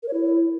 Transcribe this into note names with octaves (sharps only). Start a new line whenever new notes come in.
A#4
C#5
E4